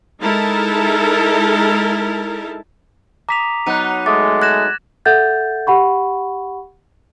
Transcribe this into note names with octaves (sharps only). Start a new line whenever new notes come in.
G#3 D#4 E4 A4 A#4 A5
A#5 D6 D#6 B6 F7
F#3 B3 D#4 F#6 D#7
G#3 A3 D6 A6
F#6 G#6 A#6 E7
A4 E5 F#5 G6 A6
G4 F#5 B5 C#6